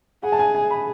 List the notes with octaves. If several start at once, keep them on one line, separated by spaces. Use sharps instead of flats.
G#4 F#5
A5
G#5
G#5
B5